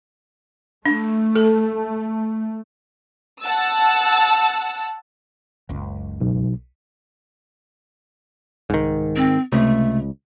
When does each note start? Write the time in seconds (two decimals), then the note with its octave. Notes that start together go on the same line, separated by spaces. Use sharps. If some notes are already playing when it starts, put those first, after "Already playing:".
0.86 A3 D4
1.35 A4
3.42 F#5 A5 E6
5.69 F#1 C#2
6.21 B1
8.70 C2 G#2 D#3
9.16 C4
9.52 C#2 C3 A3